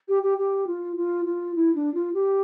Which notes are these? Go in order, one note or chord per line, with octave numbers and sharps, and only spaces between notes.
G4
G4
G4
F4
F4
F4
E4
D4
F4
G4